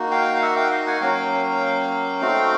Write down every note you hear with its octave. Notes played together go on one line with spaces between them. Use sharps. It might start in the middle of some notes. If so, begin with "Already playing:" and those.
Already playing: A#3 D#4 F#4
F5 G5
F5
E5 F#5
F5 G5
D#5 F5
F#5 G#5
F#3 A#3 C#4 F5 G5
A3 C4 D#4 F#4